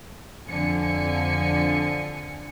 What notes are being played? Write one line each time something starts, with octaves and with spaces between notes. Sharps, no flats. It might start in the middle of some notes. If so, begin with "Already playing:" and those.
F2 D3 F3 G#5 C#7